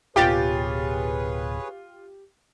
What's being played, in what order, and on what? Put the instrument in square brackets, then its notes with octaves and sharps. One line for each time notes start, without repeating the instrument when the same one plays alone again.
[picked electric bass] D1 B2 [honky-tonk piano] F4 A6 [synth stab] G4 [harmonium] G#4 B4 C#5